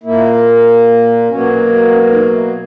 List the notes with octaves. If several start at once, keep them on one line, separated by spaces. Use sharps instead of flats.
A#2 A#3 E4
B2 F#3 A#3 C#4
C#4
D#4
E4